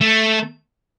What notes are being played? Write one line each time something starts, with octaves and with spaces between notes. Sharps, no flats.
A3